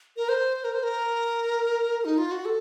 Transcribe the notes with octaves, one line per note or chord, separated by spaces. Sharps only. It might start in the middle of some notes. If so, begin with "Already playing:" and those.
A#4
C5
A#4
C5
A#4
D#4
F4
F#4
A4